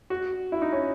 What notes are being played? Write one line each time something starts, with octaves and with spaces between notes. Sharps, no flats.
F#4
E4
D#4
C#4